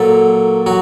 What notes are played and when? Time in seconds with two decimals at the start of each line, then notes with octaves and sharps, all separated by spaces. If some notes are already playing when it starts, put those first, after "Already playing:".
Already playing: A#2 F#3 A4
0.66 F#3 F#4